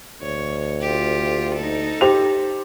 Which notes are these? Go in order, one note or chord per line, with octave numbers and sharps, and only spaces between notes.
D2 C#5
F4 G4
D#4 A4
G4 C5 F7